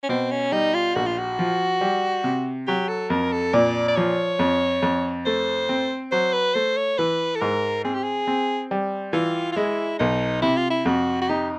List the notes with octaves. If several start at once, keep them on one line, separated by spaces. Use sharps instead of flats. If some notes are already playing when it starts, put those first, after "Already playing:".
C#4
B2 C4
C#4
G3 D#4
F4
A#1 F#4
F4
F#4
F3
G3
C3
F#3 G4
A4
F2 A#4
A4
A#2 D5
D5
F3 C#5
F2
F2
A3 C5
C4
F#3 C5
B4
A3 C5
C#5
E3 B4
A4
G#2 A#4
C4 G#4
G4
G#4
C4
G3
E3 F4
F4
G#3 E4
B1 D#4
C3 E4
F4
E4
F2 F#4
F#4
D#4 G4